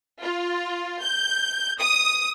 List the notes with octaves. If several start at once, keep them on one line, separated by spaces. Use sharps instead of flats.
F4
G6
D#6